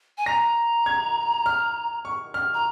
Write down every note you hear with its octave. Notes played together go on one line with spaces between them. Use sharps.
G#5
A#5 A#6
G#6
F6
C#6
F6
A#5